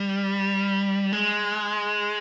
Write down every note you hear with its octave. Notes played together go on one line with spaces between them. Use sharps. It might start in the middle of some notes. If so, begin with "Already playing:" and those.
Already playing: G3
G#3